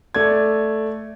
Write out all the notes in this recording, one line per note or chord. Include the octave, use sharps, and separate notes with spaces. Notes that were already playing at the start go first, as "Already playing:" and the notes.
A3 D5 G#6